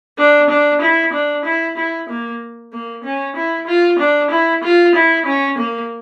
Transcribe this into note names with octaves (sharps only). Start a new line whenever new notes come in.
D4
D4
E4
D4
E4
E4
A#3
A#3
C#4
E4
F4
D4
E4
F4
E4
C#4
A#3